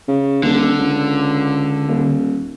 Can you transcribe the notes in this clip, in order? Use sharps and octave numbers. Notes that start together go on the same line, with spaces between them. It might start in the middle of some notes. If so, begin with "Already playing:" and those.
C#3
D#1 D3
C#2
D#1